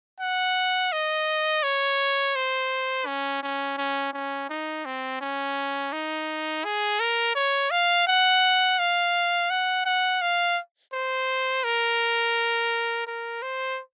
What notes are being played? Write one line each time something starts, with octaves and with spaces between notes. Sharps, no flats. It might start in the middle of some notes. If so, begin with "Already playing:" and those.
F#5
D#5
C#5
C5
C#4
C#4
C#4
C#4
D#4
C4
C#4
D#4
G#4
A#4
C#5
F5
F#5
F5
F#5
F#5
F5
C5
A#4
A#4
C5